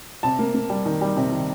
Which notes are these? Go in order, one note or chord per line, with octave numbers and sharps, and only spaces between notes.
C3 A5
A#3
A#3
G3
D#3
G3
C3
D#3